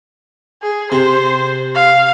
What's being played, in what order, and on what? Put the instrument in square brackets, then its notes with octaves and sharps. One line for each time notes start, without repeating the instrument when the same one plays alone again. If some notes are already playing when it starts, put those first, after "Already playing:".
[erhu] G#4
[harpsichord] C3 [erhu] C5
[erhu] F5